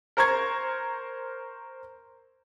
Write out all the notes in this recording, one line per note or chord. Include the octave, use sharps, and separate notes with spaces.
A#4 C5 A#5 C#6 G#6